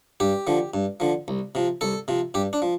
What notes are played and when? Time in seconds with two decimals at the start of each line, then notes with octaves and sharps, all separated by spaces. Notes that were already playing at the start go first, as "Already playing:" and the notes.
0.20 G2 G4
0.47 D3 F3
0.74 G2
1.00 D3 F3
1.28 C2
1.55 C3 F3
1.81 C2 A4
2.08 C3 F3
2.34 G2 G4
2.53 D4
2.62 F3